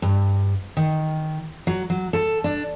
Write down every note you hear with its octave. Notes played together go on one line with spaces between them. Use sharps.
G2
D#3
F#3
F#3
A4
D4